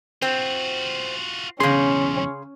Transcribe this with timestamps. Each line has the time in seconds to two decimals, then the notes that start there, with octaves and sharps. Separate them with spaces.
0.22 C4 F4 F#4
1.60 B1 E2 C#3 C#4 G#4 C6